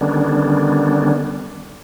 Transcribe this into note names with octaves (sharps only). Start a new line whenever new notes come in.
D3 D#3 G3 B3 C#4 D4